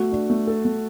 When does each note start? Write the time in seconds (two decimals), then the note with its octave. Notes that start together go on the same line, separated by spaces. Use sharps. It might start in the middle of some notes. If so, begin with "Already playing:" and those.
Already playing: A3 F#4
0.12 D4
0.30 A3
0.47 A4
0.65 A3